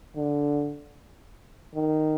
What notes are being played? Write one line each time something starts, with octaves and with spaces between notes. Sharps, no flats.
D3
D#3